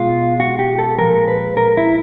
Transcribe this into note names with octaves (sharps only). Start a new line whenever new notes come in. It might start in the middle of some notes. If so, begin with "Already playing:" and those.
Already playing: B2 G#3 F4
F#4
G4
A4
A#2 F3 G#3 A#4
B4
A#4
E4